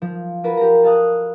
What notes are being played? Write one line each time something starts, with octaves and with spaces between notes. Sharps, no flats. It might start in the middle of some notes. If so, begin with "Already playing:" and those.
F3
F4 F#4 A#4 B4
G4 A#5
A4 D#5 F5 A5 D#6 F#6